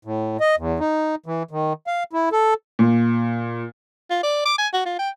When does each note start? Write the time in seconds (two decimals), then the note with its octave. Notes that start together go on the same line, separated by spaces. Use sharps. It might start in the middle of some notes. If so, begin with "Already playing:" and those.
0.05 A2
0.40 D#5
0.58 E2
0.80 D#4
1.26 E3
1.51 D#3
1.87 F5
2.13 E4
2.32 A4
2.79 A#2
4.10 F4
4.23 D5
4.45 D6
4.58 G#5
4.73 F#4
4.86 F4
4.99 G5